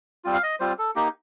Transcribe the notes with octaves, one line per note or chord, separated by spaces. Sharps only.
G3 C4 F4
F5
D#5
G3 C4 F4 C5
A4
A#3 D#4 G4